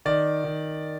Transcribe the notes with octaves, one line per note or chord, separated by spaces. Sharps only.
D#3 D5
D#3